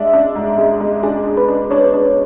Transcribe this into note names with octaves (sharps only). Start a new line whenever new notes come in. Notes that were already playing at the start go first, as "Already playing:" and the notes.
Already playing: G#3 D4 E5
D4
G#2
G#3
G#3
D4 G#4
D4
B4
D4
D4 C#5
D4